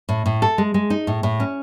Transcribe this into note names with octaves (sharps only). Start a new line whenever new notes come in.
A2
A2
A4
G#3
G#3
D#4
A2
A2
C#4